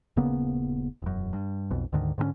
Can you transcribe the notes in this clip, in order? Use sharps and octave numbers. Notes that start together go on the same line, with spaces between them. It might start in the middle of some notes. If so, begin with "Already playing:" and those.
D#1 C#3 A#3 B3
E1 F#2
G2
B1 F2 B2
D2 G#2 D3 D#3
G#2 D3 F#3 C#4